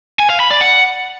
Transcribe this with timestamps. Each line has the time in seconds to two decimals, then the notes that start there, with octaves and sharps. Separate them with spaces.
0.20 G#5
0.30 F5
0.40 B5
0.51 D5
0.61 F#5